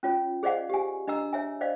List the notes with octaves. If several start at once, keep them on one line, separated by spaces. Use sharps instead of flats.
C#4 F4 C#5
G#4 C5 D5 D#5 F5 F#5
G4 G#5
D4 D#5 A#5 E6
C#5 E5 G#5
C5 D5 D#5 F5